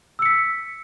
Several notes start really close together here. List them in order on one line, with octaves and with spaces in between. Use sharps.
E6 C#7 B6